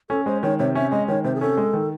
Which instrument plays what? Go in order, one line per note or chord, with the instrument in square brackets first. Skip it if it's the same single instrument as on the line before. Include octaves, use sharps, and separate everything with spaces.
[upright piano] C#4 [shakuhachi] A4
[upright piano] G#3 [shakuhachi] C5
[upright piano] D#3 [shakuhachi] C#5
[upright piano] C3 [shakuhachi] C#5
[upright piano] C#4 [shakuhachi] E5
[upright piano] G#3 [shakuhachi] D#5
[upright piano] D#3 [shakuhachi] C#5
[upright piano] C3 [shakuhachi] C5
[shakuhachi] G#4
[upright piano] C#4 [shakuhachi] A4
[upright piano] G#3
D#3